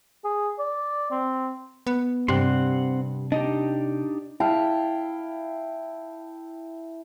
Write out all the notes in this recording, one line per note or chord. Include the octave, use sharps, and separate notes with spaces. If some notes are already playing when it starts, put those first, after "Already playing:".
G#4
D5
C4
B3
G2 C3 C4 G4 F#5 C6
D4 D#4 G4 D#5
E4 F5 G5 A5